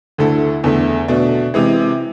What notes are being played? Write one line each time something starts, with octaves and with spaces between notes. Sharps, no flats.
D2 D3 A3 E4 A4
E2 D3 A3
B2 A3 D4
C3 E3 G#3